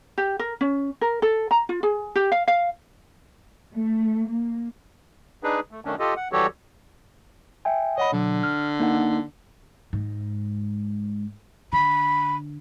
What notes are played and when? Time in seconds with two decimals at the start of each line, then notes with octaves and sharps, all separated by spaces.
0.18 G4
0.39 A#4
0.61 C#4
1.01 A#4
1.22 A4
1.51 A#5
1.69 F4
1.83 G#4
2.15 G4
2.32 F5
2.48 F5
3.74 A3
4.28 A#3
5.43 D4 D#4 G#4 B4
5.71 A3
5.85 F#2 D#3 A3 C#4 D4
5.99 F4 G4 A4 D#5
6.17 F#5
6.32 E3 G3 F#4 G4 A4 C#5
7.65 E5 G5 G#5
7.98 C#5 D#5 F#5 B5
8.12 B2 D3 F#3
8.43 F6
8.80 A#3 D#4 F#5
9.93 G#2
11.73 D3 B5